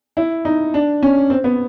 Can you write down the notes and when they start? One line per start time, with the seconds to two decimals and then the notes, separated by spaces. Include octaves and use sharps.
0.17 E4
0.45 D#4
0.74 D4
1.03 C#4
1.30 C4
1.44 B3